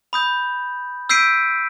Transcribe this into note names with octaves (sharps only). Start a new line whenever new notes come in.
B5 D#6 G6
E6 G6 B6 C7 D7 D#7